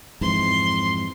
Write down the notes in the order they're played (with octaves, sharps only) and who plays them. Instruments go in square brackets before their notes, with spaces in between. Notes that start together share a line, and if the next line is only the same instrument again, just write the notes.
[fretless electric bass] F2 G#2 E3 [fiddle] C6